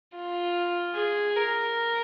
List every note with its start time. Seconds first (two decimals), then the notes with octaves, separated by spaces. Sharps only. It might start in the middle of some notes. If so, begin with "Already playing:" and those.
0.15 F4
0.95 G#4
1.36 A#4